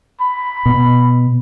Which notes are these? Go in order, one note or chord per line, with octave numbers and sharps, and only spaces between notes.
B5
B2